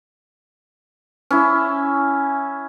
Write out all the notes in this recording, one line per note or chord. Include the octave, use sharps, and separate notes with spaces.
C#4 E4